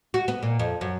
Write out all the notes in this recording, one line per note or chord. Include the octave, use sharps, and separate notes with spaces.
F#4
B3
A#2
F2
F#2